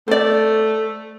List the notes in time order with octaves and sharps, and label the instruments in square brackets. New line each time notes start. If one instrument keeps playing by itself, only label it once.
[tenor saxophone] A3 [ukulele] C5 D5